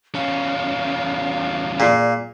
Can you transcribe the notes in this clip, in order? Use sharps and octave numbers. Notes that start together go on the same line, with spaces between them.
E2 C#4 F5
A#2 G#4 D5 C7